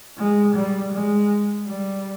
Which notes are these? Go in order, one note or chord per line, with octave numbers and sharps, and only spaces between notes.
G#3
G3
G#3
G3